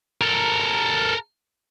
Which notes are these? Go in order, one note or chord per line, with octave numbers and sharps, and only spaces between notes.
A4 A#4